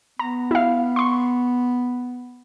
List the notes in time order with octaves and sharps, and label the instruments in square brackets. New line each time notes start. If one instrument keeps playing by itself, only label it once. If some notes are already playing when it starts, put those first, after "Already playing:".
[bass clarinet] B3 [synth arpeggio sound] A#5
[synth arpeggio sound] E4 F5
C6 C#6